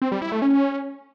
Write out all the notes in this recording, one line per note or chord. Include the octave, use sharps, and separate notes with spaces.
C4
G3
E4
A3
C#4